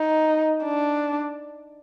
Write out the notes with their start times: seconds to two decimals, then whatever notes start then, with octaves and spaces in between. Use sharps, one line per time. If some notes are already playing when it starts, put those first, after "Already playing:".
Already playing: D#4
0.64 D4